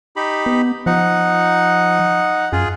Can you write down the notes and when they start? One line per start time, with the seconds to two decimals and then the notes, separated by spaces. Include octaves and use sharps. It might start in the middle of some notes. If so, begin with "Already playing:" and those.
0.16 D#4 G4 B5
0.46 B3
0.86 F3 D#4 F#5
2.52 F#2 F4 G#4